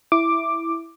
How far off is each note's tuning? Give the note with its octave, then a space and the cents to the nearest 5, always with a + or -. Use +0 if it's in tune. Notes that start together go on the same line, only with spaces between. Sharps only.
E4 +0 D6 +5